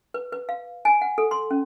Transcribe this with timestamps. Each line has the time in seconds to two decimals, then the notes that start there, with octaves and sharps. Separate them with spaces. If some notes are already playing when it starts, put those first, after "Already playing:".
0.14 B4
0.33 B4
0.49 F5
0.85 G#5
1.01 F#5
1.18 A4
1.31 C6
1.51 C#4